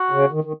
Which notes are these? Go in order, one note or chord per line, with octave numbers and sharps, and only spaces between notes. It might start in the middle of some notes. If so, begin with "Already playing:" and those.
Already playing: F#4
C#3
D#3
D#3